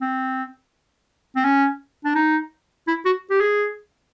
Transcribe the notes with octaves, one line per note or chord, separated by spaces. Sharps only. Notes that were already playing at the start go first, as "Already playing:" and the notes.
C4
C4
C#4
D4
D#4
E4
F#4
G4
G#4